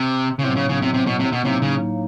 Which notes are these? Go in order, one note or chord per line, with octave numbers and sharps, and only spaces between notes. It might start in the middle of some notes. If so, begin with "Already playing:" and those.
Already playing: C3
C#3
A2 C3 F#3 B3
C#3
C#3
C3
C3
B2
C3
B2
A2 C3 F#3 A#3 D#4
C#3